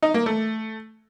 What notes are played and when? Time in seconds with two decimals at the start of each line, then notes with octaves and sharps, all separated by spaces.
0.03 D#4
0.14 A#3
0.26 A3